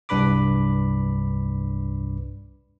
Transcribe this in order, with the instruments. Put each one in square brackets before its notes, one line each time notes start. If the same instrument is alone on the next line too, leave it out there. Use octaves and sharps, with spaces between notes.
[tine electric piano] C2 G2 D4 B4 B5 D6